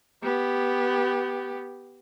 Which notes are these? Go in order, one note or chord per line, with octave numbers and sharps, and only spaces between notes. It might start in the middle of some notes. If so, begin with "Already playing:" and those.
B3 G4